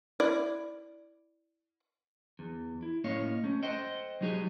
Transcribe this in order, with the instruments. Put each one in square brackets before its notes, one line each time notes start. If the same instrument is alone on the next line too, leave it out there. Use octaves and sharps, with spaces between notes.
[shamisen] E4 D5
[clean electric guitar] E2
E4
A2 A#3 C#4 C#5 D#5 F5
A3 C#4
A4 C5 D#5 F#5 G5
F#3 G#3 D#4 G4 G#4